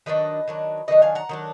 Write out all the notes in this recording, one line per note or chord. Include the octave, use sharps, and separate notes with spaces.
D#3 F#3 D4 B4 D#5
D#3 F#3 D4
D#3 F#3 D4 B4 D#5
F5 G#5
F#5 A#5
D#3 F#3 D4